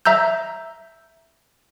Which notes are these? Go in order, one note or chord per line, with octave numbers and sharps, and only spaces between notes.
E5 A#5 E6 G6